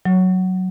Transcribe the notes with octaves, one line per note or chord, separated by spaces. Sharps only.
F#3